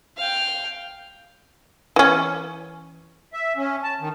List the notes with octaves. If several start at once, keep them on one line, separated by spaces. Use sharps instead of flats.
F5 G5
E3 C#4
E5
C#4
A5
D#3